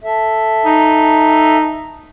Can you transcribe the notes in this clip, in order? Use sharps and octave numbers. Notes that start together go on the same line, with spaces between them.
A4 E5
D#4